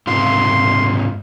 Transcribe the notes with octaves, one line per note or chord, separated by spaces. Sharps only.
G#2 C3 F4 C6